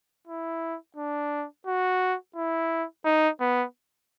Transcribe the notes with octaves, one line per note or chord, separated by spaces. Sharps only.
E4
D4
F#4
E4
D#4
B3